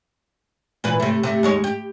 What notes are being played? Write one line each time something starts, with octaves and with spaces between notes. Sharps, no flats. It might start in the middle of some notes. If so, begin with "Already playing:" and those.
A#2 E3 B4
C3 A3
C3 A3
D#2 G#3 C#5
G4